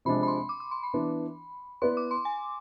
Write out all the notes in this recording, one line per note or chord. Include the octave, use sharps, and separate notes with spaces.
C3 F3 G#3 D4 B5
B5
C6
D6
D6
C6
B5
E3 B3 D4
B3 E4 B4 D5 C6
D6
C6
G#5